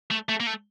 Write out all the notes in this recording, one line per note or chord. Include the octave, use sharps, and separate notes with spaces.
A3
A3
A#3
A3